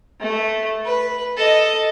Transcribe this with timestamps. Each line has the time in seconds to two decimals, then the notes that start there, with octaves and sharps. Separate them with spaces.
0.20 A3
0.85 B4
1.37 A4 D#5